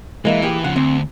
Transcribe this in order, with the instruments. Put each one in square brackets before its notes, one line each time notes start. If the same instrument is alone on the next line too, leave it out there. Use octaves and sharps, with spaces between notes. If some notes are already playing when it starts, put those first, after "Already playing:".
[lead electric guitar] E3 [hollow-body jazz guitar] G#3 A#3 E4
[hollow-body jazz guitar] A#2 G4 G#4
[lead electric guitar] C#3 F3 [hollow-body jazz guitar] F#5
[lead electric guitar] D2 [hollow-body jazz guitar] C4